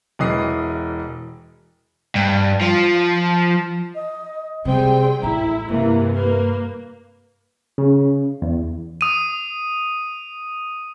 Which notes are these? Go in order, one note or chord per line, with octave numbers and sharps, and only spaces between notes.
E1 E3 D#5 D#6 C7
G2
F3
D#5
C3 G3 C4 G#4 G5
A1 D#4 E4 A#5
G2 C3 E3 A#3
A#3 B4
C#3
E2
D#6 D#7